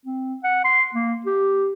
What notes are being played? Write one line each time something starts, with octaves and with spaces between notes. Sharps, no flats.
C4
F#5
C6
A#3
G4